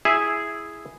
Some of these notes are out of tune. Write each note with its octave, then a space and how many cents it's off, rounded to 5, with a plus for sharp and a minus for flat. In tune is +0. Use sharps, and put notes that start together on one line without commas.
E4 +0 G#4 +0 E5 -5